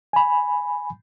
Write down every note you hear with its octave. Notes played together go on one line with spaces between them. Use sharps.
G#5 B5